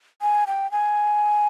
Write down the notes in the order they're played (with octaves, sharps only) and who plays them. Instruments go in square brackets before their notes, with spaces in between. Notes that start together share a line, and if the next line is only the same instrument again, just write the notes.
[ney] G#5
G5
G#5